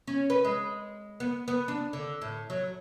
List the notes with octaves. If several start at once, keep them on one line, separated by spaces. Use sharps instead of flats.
C#4
B4
G#3
B3
B3
D4
D3
A2
F#3